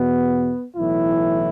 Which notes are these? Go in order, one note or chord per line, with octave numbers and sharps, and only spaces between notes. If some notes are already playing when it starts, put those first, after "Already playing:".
Already playing: E2 B2 B3
B1 A2 E3 E4